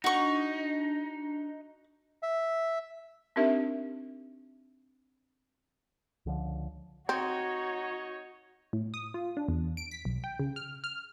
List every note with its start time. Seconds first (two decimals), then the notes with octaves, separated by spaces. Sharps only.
0.04 D4 D#4 F#4 C#6
2.23 E5
3.36 C4 D4 D#4 G4 A#4 E5
6.26 C#2 D3 F3
7.09 C4 D#4 F#4 C#5
8.73 A2
8.94 D#6
9.14 F4
9.37 D4
9.49 E2
9.77 D7
9.91 B6
10.05 B1
10.24 G5
10.40 C#3
10.56 F6
10.84 F6